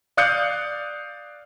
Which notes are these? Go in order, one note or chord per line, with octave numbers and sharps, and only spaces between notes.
D5 F5 D#6 F#6 G6 C#7